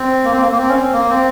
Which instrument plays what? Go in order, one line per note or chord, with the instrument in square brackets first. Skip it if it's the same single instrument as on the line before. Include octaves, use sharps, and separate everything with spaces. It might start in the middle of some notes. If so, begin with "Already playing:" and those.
Already playing: [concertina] C4
A#3
C4
A#3
A#3
C4
C#4
C4
A#3
C4